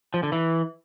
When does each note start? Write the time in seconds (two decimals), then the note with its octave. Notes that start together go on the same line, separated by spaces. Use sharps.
0.14 F3
0.23 D3
0.32 E3